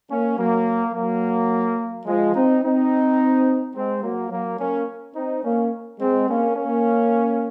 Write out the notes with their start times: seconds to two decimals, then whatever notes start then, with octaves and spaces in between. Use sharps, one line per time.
0.10 A#3 C#4
0.38 F#3 A#3
0.94 F#3 A#3
2.06 F3 G#3
2.34 C4 D#4
2.62 C4 D#4
3.74 G#3 C4
4.02 F#3 A#3
4.30 F#3 A#3
4.59 A#3 C#4
5.15 C4 D#4
5.44 A#3 C#4
5.99 G#3 C4
6.28 A#3 C#4
6.56 A#3 C#4